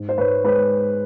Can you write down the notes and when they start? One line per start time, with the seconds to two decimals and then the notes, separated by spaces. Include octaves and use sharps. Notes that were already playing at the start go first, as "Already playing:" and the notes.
Already playing: G#2
0.09 C5
0.18 G#2 B4 C#5
0.44 G#3 B4 C#5